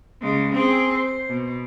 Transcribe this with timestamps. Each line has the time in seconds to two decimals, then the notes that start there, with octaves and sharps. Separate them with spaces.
0.21 C#3 G#3
0.53 C4 G#4
0.95 C5
1.29 B2